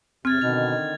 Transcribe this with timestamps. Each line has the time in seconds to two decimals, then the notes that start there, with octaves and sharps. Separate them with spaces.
0.25 E2 C3 C4 F6 G#6 A6
0.42 B2 D3 D#3 D#4 F7